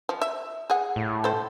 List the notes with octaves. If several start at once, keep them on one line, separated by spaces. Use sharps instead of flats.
F3
E5
G#4 F#5
A2
A4 C5